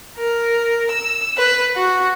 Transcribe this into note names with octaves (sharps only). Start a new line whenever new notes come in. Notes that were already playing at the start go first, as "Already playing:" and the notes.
A#4
E6
B4
F#4